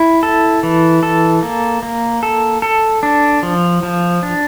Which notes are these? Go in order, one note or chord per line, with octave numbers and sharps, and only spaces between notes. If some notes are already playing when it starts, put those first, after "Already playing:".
Already playing: E4
A4
E3
A4
A#3
A#3
A4
A4
D4
F3
F3
D4